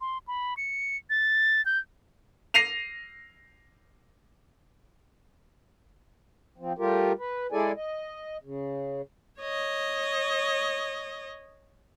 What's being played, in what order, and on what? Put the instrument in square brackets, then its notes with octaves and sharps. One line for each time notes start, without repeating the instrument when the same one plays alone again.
[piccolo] C6
B5
C#7
A6
G6
[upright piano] A#6 C7 D#7 F7
[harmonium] F3 C4
G3 A3 F4 G4 A#4
B4
G#3 E4 G#4 A4 D5 G#5
D#5
C#3
[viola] C#5 D#5